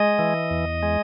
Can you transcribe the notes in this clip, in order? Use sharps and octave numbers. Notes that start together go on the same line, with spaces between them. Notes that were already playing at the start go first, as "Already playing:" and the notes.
Already playing: G#3 D#5
E3
E2
G#3